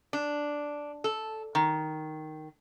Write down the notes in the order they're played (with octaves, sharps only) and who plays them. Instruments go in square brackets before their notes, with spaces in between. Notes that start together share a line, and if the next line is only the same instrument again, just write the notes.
[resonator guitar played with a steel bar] D4
A4
D#3